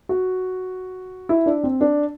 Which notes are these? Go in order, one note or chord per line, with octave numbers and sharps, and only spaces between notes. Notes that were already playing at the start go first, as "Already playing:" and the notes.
F#4
E4
D4
C4
D4